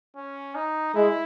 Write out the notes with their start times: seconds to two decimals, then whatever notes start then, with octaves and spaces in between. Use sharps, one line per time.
0.16 C#4
0.55 D#4
0.95 G#3 E4